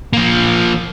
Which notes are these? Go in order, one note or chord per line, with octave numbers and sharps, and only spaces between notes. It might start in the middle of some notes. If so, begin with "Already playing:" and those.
F3 A#3